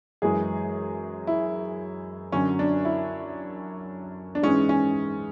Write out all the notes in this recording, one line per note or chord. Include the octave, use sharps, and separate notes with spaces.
F#2 E3 G#3 G#4
E4
F#2 D3 F#3 C#4
D4
E4
D4
G#2 E3 G#3 C#4
C#4